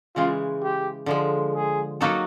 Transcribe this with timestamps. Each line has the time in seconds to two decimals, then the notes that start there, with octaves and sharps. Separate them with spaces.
0.16 C#3 E3 G#3 F4
0.63 G4
1.06 D3 F3 G#3
1.55 G#4
2.01 F#3 A#3 D#4 F#4 A4